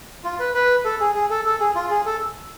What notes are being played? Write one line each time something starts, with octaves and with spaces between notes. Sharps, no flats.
F4
B4
B4
A4
G#4
G#4
A4
A4
G#4
F4
G#4
A4